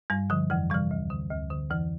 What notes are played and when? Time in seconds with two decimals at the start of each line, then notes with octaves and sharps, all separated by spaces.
0.10 G2 G3
0.30 D3 F3
0.50 F2 E3
0.70 C3 E3 G3
0.91 D2
1.10 D3
1.30 D2
1.51 D3
1.71 F2 E3